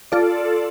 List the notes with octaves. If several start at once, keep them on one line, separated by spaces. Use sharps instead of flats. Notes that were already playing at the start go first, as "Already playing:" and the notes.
F4 A4 D5